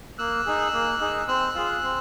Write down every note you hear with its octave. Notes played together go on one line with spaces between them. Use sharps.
A#3 E6 F#6
D#4 G#4
A#3
D#4 G#4
C4 E6 F#6
F4 G#4
C4